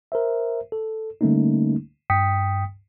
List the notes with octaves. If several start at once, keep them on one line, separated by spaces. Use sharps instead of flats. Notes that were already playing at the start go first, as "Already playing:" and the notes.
A#4 C5 E5
A4
D3 G3 A3 A#3 C#4 D#4
G2 G5 D#6 B6 C#7